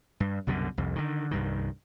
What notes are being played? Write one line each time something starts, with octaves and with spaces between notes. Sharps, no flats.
G2
C2 F#2 B2 D3
C2 F2
D3 D#3
C2 G2 D#3